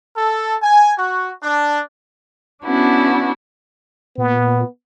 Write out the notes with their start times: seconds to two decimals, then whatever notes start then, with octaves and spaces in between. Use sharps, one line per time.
0.16 A4
0.63 G#5
0.99 F#4
1.43 D4
2.65 B3 C#4 D4 E4 F#4
4.18 A#2 B3